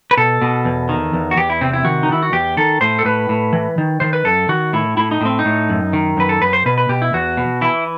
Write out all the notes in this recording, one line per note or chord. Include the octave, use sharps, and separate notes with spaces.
B4
B2 A4
B2
E2
D#3
E2
F#4
E2 G4
E4
C3 C4
E4
D#3 F#4
D#4
D#3 E4
F#4
E2 G4
D#3 A4
A2 C5
A4
A2 B4
A2
E3
D#3
D#3 C5
B4
F#2 A4
D#3 F#4
A2 E4
A2 E4
D#4
A2 C4
D#4
A2
F#2
D#3
F#2 B4
A4
F#2 B4
C5
B2 B4
B4
B2 G4
E4
E2 F#4
B2
E3 E4